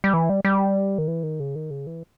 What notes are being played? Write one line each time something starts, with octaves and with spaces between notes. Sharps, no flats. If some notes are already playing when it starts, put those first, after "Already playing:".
G3
E3
G3
G3
D#3
E3
D#3
C#3
D#3
C#3
E3